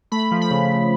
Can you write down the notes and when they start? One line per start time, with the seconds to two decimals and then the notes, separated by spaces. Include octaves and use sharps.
0.12 A3 B5
0.31 F3
0.42 B5
0.51 C#3
0.70 C#3